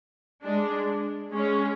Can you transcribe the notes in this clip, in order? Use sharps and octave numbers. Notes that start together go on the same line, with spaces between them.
G#3 D4
G#3 C#4